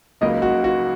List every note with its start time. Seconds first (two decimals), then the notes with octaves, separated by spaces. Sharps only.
0.21 C#2 C#3 F#3 A#3 D#4 D#5
0.42 F#4
0.64 F#4